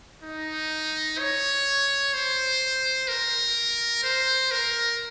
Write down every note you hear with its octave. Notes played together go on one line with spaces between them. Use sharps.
D#4
C#5
C5
A#4
C5
A#4